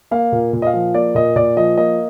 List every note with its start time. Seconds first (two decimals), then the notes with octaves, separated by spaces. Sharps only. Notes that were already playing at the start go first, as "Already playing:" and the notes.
0.11 A#3 F5
0.32 A#2
0.53 A#2
0.62 D#5
0.67 F5
0.74 F3
0.94 A#3 D5
1.15 A#2 D#5
1.36 A#2 D5
1.57 F3 D#5
1.77 A#3 D#5